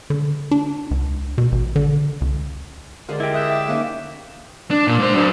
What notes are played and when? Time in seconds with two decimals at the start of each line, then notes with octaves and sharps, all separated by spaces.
0.10 D3
0.51 D4
0.91 C#2
1.38 B2
1.52 A1
1.76 D3
2.21 C#2
3.09 D3 G#3 A#4 C5 D5
3.20 E4 G4 D#5
3.34 E5 D#6 F#6 G6
3.51 G5 D6
3.68 A#3 C#4 D#4
4.71 D4
4.87 A#2
4.99 G#2 C5
5.15 F#3 D4